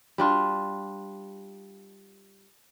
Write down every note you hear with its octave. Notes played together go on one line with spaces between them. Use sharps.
G3 D4 F4